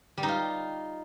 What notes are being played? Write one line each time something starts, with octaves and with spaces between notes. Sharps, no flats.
G3
D#4
F4